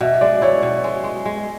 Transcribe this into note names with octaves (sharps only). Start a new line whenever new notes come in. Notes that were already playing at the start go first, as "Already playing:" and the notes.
B2 E5
G#3 D5
E4 C#5
B2
G#3
G#3
G#3